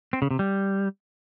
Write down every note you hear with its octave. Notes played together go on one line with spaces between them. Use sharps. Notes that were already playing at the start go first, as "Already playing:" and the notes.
C4
C#3
C3
G3